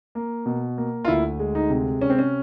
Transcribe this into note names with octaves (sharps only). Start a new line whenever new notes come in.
A#3
B2
A#3
F4
D2 E4
G#3
D#4
C3
C3 C#4
C4
C#4